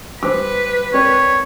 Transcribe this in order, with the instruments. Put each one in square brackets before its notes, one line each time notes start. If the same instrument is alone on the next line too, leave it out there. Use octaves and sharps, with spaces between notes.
[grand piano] G3 C5 [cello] B4 [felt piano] D6
[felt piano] C4 A#4 D5 [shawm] C#5